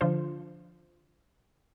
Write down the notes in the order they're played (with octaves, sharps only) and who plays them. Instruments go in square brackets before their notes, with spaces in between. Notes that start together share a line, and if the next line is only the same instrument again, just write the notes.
[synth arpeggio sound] D3 F3 D4 F4 C5